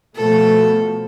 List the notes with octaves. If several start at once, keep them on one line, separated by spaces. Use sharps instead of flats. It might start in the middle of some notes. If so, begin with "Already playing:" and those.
B2 F3 A3 A4